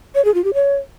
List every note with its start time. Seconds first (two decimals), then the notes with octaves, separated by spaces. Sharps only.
0.15 C#5
0.25 G#4
0.34 F4
0.44 G4
0.54 C#5